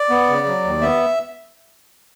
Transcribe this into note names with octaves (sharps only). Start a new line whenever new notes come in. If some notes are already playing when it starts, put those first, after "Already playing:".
Already playing: D5
B3
C#3
F#3
D#2
B3 E5